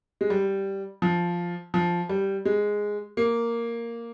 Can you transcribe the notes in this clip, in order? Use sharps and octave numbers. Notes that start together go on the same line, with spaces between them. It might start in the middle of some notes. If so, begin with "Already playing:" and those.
G#3
G3
F3
F3
G3
G#3
A#3